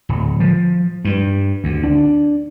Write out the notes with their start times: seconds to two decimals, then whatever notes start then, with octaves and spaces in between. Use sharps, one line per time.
0.09 D1
0.40 F3
1.05 G2
1.64 D2
1.84 D4